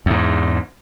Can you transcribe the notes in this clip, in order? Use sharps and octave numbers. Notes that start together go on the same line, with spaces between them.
E2 G#2